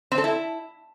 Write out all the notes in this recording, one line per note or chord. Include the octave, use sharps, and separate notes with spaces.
C4
A4
E4